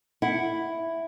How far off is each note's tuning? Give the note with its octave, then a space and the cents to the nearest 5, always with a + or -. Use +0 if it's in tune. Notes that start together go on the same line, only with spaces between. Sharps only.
E4 +0 F#5 +0